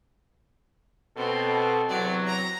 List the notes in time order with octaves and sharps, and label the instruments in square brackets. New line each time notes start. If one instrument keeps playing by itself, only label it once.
[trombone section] B2 A4 [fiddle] C4
[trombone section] E2 C3 F#3 [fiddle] D5
[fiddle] A#5